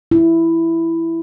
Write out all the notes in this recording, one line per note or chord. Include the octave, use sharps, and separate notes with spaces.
E4